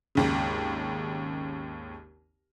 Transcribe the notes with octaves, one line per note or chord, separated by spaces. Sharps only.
G#1 D#2 C#3